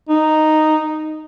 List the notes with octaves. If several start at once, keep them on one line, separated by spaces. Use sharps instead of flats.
D#4